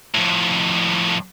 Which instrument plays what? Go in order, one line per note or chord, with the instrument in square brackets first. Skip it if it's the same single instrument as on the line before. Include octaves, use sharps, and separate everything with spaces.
[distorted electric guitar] F2 A2